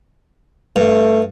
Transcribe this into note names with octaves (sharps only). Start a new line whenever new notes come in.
G2 A3